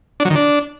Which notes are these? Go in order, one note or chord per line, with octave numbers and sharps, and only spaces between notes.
D4
F#3
D#3
D4